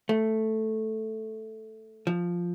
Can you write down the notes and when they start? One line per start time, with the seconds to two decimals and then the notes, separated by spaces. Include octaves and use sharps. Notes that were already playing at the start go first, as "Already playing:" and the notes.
0.09 A3
2.07 F3